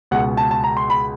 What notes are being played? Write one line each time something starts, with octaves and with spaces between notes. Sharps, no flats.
C#2 B2 G#3 F#5
A5
A5
A#5
C6
B5